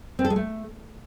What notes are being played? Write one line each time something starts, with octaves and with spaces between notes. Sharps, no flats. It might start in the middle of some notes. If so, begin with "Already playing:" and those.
C4
A4
G#3
A3